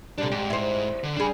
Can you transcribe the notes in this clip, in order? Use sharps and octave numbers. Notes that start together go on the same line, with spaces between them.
C3 G3 D4 A4
G#2 G4
E4 C5
D3
G3 D4 G#4 B5